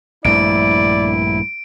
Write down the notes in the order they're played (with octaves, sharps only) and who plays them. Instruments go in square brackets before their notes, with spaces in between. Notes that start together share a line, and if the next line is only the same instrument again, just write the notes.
[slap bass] A#1 G2 A3 [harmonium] E4 [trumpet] D5 [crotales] D7